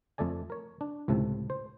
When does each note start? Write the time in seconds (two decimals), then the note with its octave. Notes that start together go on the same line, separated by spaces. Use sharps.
0.18 F2 A3 A4 D5 G#5
0.50 A#4 C#5
0.81 D4
1.08 C#2 A2 C3 A4
1.50 C5